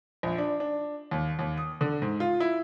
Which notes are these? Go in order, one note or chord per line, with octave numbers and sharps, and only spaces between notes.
A#1
D4
D4
D#2
D#2
D#6
D3
G#2
F4
E4